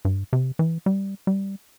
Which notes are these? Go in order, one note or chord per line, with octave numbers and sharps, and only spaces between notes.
G2
C3
E3
G3
G3